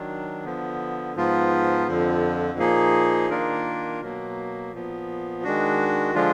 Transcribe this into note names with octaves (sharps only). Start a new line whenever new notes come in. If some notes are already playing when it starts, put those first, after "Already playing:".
Already playing: D#3 F#3 D4
D3 F3 B3
G#2 F3 B3 F4
F2 D3 F3
A#2 F3 A#3 D#4 G#4
D#3 A#3 D4 F4 A#4
B2 F#3 A#3
A#2 F3 B3
D#3 G#3 D4 F#4
D3 F3 G#3 D4 F4